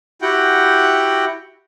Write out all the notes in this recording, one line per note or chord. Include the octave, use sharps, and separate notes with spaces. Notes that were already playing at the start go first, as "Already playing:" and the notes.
E4 F#4 G4 F#5 G5